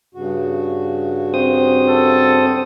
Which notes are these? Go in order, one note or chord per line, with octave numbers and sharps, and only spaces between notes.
G2 C#3 F#4
C4 C5 D#6
A4